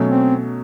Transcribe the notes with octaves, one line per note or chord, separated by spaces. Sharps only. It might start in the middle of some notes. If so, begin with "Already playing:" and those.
Already playing: B2 F#3 A3 C#4
C4